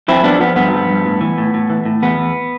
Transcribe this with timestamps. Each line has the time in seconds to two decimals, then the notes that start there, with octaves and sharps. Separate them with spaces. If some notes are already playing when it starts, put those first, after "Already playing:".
0.08 F3 C4 E4
0.24 F3 B3 D4
0.40 F3 B3
0.56 G2 B3
0.72 F3
0.90 G2
1.06 A2
1.21 E3
1.38 A2
1.54 A2
1.70 E3
1.85 A2
2.02 E2 B3
2.19 E2